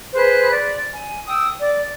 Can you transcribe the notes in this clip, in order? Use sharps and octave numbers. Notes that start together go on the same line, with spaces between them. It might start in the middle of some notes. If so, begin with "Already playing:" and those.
G#4 B4 C5 F#6
D5
G#5
G5 D#6 E6
D5